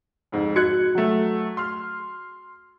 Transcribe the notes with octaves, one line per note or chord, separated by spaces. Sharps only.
F2 G#2
F#4 D#5 F#6 G#6 C#7
F#3 A3
C6 F6